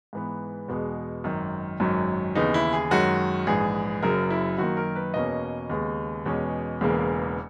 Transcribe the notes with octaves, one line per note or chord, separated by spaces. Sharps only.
G#2 E3 B3
E2 B2 G#3
G#1 F#2 D#3
G#1 F#2 D#3 F#3 C#4
D#2 C#3 E3 B3 D#4
E4
G#4
F#2 D#3 G#3 C#4 F#4
A#1 G#2 E3 G#4
F#1 F#2 C#3 F#3 A#4
E4
F#2 D#3 A#3 F#4
A#4
B4
E2 B2 A#3 C#4 D#5
D#2 C#3 G#3 B3
E2 B2 G#3 C#4
E1 E2 C#3 E3 A#3